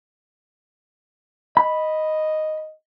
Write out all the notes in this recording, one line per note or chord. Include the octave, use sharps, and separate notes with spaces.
D#5 B5